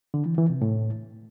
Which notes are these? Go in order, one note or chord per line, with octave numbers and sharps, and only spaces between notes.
D3
E3
E3
C3
A2